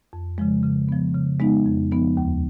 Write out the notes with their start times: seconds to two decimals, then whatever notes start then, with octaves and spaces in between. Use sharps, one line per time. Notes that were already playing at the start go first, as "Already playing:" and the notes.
0.13 F2
0.38 C#3 F3 G#3
0.63 C#3
0.89 F3 B3
1.14 C#3
1.40 G#3 B3 D#4
1.66 F2
1.92 F3 B3 D#4
2.17 D#2